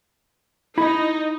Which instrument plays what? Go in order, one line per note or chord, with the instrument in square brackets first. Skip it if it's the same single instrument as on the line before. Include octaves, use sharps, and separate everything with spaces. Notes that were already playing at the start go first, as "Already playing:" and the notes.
[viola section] D#4 [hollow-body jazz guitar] E4 B5